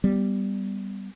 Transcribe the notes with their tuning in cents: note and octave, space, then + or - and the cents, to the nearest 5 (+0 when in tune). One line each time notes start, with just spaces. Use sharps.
G3 +0 B3 +0